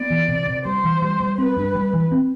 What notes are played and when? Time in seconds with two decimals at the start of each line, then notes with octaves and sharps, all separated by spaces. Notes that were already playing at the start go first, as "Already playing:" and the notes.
Already playing: B3 D5
0.10 E3
0.28 C3
0.48 C3
0.65 G3 C5
0.84 E3
1.02 G3
1.20 G3
1.38 C4 B4
1.57 G2
1.75 G3
1.94 E3
2.12 C4